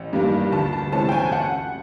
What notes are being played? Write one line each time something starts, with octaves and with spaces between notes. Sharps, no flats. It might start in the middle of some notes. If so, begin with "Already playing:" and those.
Already playing: A1
G2 D#3 G3 A#3
D2 A5
A5
C3 E3 G#3 C#4 A5
G5
G#5
F#5